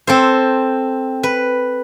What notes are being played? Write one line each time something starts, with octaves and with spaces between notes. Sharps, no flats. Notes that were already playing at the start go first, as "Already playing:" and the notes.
C4 A4 C5
B4